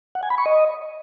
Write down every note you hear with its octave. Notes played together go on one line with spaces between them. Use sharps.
F#5
G#5
B5
C#6
D#5